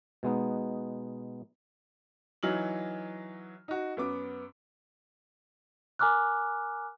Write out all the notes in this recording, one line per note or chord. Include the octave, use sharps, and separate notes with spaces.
B2 G#3 B3 D#4
E3 F#3 D#4 F6 F#7
D#4 F#4
F#2 B3 D6
A#4 G#5 A#5 D6 F6 F#6